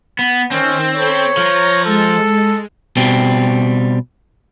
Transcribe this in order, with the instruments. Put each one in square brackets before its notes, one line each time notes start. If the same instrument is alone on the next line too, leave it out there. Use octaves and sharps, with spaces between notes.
[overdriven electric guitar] B3
[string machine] D#3 [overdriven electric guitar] C4 [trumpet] C#4
[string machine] A4 C5 B5 [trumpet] C#5
[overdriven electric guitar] F3 [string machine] A#5 A#6
[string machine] G#3 [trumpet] A4
[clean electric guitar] B2 G3 C4